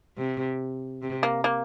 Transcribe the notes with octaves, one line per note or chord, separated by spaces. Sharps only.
C3
C3
A#3
A#3